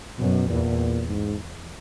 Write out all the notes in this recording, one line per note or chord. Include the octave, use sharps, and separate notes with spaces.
F#2 B2
E2 A#2
G#2